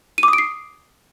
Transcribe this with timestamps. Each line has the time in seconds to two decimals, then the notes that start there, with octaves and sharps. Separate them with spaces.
0.18 D#7
0.23 D6
0.28 D#6
0.33 D7
0.38 C7